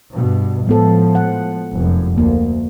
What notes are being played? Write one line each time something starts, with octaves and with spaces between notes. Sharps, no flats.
G2 B2
A2 F3 G#3 B3 A4
F#5
F1 F#2
D2 A#3